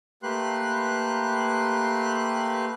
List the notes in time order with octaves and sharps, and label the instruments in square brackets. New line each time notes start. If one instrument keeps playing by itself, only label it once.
[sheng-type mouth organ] A3 A#3 G4 B4 C6 F#6